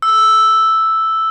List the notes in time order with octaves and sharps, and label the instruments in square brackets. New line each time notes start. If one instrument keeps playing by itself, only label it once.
[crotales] E6